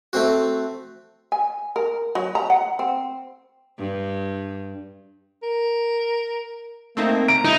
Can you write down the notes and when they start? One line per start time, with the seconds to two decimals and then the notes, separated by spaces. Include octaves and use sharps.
0.13 A3 C4 F#4
1.32 G#5
1.76 A#4
2.15 F#3
2.35 A#5
2.50 F#5
2.79 C4
3.78 G2
5.43 A#4
6.97 A3 A#3 C4 D#4
7.28 A#5 D7
7.45 D#4 E4